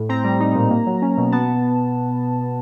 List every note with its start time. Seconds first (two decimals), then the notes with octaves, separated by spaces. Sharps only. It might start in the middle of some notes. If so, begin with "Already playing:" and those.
Already playing: A2
0.09 C4 A#5
0.24 G3
0.40 D#4
0.55 A#2
0.70 A#3
0.86 F#3
1.02 C#4
1.17 B2
1.32 B3 A5